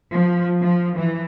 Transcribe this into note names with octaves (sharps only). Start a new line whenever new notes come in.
F3
F3
E3